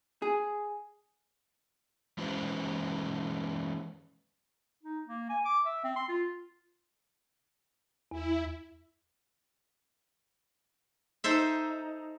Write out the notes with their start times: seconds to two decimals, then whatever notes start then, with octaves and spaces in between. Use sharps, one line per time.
0.22 G#4
2.18 E3 G#3 C#4 B4 C5
4.83 D#4
5.07 A#3
5.29 G#5
5.45 D6
5.65 E5
5.84 C4
5.96 C6
6.09 F4
8.11 E2 E4
11.24 D#4 A4 C5 E5